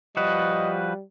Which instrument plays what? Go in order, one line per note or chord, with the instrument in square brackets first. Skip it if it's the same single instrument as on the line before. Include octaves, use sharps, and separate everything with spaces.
[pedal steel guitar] F3 F#4 B4 [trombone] G3 [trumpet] D#5